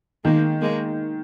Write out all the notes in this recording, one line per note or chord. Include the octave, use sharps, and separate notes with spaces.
D#3 G#3 A#3
G#3 A#3